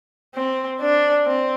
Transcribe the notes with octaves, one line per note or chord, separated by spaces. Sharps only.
C4
D4
C4